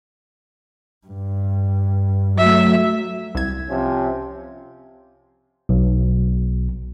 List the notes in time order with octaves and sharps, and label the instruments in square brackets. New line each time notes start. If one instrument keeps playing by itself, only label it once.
[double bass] G2
[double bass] F#3 A3 [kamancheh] E5
[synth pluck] C2 G#6
[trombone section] C3 F3 C#4
[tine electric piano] B1